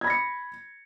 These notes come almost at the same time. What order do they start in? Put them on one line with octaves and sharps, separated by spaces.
G#6 B5 A#6 C#7